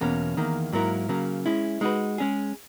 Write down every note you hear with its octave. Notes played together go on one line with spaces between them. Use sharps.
E2 B2 A#3 C#4
E2 D#3 A#3
G#2 F#3 A#3 E4 A#4
C#3 F#3 A#3
G#3 C#4 E4
G#3 D#4 F#4 B4
G#3 C#4 G#4